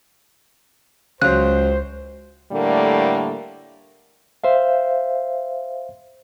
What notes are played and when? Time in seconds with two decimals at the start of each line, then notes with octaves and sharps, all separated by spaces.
1.22 C#2 C#3 F#3 C5 F#6
2.52 A2 D3 G3 A3 A#3
4.44 C5 E5 F5